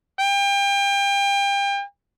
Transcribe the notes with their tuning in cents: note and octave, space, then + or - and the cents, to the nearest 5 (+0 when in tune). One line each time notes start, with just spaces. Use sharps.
G5 +35